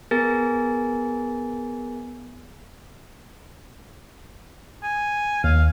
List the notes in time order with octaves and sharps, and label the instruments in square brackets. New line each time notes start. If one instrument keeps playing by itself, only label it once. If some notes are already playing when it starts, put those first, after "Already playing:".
[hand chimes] B3 G#4 A#4 G#5 A6 A#6
[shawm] G#5
[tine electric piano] D#2 [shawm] F5